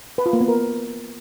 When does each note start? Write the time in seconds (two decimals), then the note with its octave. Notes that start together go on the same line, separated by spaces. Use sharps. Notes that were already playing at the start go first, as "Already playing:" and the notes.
0.18 B4
0.26 F4
0.33 A#3
0.41 B3
0.48 A#4